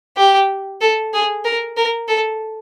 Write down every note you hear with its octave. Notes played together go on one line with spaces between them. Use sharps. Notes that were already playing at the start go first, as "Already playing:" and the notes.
G4
A4
G#4
A#4
A#4
A4